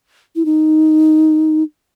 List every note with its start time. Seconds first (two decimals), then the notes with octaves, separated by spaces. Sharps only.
0.36 E4
0.45 D#4